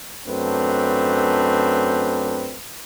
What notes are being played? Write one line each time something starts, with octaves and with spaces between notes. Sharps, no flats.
F#2 A3 C4 D4 B4